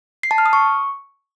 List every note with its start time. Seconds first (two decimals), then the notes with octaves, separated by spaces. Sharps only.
0.23 C7
0.31 A5
0.38 F6
0.46 D#6
0.53 C#6